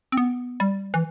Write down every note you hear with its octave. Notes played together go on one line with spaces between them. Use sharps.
C4
B3
G3
E3